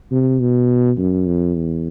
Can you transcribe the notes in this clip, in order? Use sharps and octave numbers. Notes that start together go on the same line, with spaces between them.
C3
B2
F#2
F2
E2